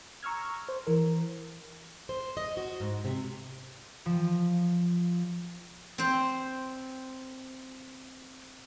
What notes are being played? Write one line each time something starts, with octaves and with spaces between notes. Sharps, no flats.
A#5 C#6 E6 F6 G#6
C5
E3 A#4
C5
D#5
F#4
G#2
C3
F3
C4 C5